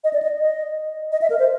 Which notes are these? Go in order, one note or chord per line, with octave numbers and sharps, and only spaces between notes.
D#5
D5
D#5
D#5
D#5
E5
A#4
C5